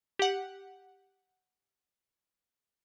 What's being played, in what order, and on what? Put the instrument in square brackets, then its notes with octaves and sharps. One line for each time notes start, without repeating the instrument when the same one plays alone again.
[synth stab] G4 F#5